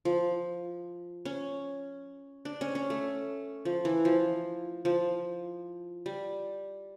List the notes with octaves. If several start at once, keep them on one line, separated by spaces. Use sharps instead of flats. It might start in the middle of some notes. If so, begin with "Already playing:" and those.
F3
C#4
D4
C#4
C#4
A3
F3
E3
F3
F3
G3